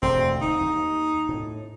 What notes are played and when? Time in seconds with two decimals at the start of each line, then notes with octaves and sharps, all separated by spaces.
0.02 E1 D2 C4
0.41 D#4
0.61 D#2
1.29 A2